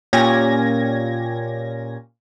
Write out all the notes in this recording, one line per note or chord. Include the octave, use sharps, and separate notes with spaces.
A#2 C#4 G4 G#6 A#6